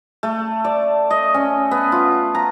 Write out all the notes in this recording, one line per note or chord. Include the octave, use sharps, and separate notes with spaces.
A3
D5
D#5
C#4
B3
F4
A#5